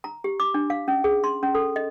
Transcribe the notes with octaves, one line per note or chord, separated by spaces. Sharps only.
A#5
G4
D6
D4
F5
C#4
G#4
C6
C#4
A4
D#5